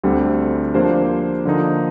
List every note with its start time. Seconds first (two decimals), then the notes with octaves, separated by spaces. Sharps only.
0.03 D2 D3 G3 C4
0.74 F3 A#3 D4 G4 C5
1.45 D3 F3 A#3 D#4